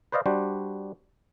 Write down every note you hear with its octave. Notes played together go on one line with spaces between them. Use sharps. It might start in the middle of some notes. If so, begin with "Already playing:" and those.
B4 C5 D5 D#5 F5
G3 D4 F#4 C5